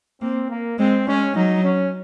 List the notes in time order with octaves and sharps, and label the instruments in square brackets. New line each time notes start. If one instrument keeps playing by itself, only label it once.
[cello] A#3 [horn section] C4
[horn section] A#3
[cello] G#3 [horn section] C4
[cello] G#3 [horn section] C#4
[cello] F#3 [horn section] D#4
[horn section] C#4